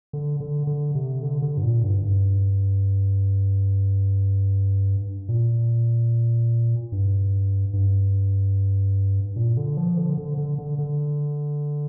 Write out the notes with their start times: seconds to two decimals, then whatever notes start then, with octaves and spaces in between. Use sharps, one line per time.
0.13 D3
0.40 D3
0.67 D3
0.95 C3
1.22 D3
1.42 D3
1.57 G2
1.63 A#2
1.83 G2
2.03 G2
5.29 A#2
6.92 G2
7.73 G2
9.36 A#2
9.57 D3
9.77 F3
9.97 D3
10.18 D3
10.38 D3
10.58 D3
10.78 D3